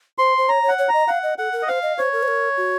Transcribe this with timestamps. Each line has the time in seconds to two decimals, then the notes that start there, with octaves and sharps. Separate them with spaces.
0.18 C5 C6
0.38 C5
0.49 C#5 A#5
0.63 C#5
0.68 F#5
0.78 C#5
0.89 D#5 A#5
1.08 F5 F#5
1.23 D#5
1.38 A4 F#5
1.53 A#4
1.63 D#5
1.68 C5 F5
1.83 D#5
1.98 C5 C#5
2.13 A#4
2.23 C5
2.28 A#4
2.57 F#4